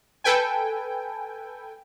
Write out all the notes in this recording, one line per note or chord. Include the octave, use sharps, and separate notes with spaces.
A4 B4 G5 G#5